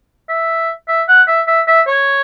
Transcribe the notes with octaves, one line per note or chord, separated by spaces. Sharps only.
E5
E5
F#5
E5
E5
E5
C#5